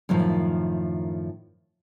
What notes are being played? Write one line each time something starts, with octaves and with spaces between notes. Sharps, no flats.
F#2 A2 D#3 F3